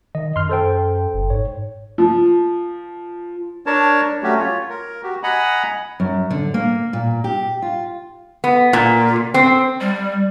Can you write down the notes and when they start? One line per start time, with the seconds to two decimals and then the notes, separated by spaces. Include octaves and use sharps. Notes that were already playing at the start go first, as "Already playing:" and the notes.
0.15 D#3 D#5
0.36 F#2 C6 F6
0.49 A4 C5 G5
1.14 G1
1.30 G#2 C#5
1.98 F3
3.66 D4 A#4 C#5 A5
4.23 F#3 A3 C#4 F#4 G4
4.38 F4 C#5
4.70 A#4
5.03 F#4 G4
5.23 D#5 F#5 G#5 A#5 B5
6.00 F#2
6.31 D3
6.54 A#3
6.93 A#2
7.24 G4
7.62 F4
8.44 B3
8.73 A#2
9.34 C4
9.81 G3